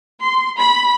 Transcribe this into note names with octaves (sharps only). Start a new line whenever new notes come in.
C6
B5